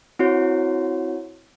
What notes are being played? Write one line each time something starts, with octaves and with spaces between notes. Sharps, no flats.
C4 E4 F#4 C#5